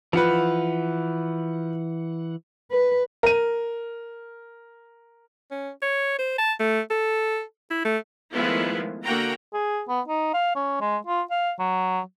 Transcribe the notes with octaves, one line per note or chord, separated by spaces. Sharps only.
E3 F3 B4 F#5
B4
A#4 D#7
C#4
C#5
C5
A5
A3
A4
E4
A3
D#3 F3 G#3 A3 B3 E4
D3 A#3 F#4 F#5 G5 A#5
G#4
B3
D#4
F5
C#4
G#3
F4
F5
F#3